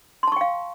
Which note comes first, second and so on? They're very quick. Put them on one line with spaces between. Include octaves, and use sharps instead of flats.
C6 A5 C#6 G5 F5